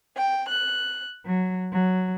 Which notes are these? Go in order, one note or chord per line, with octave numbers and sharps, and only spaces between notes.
G5
F#6
F#3
F#3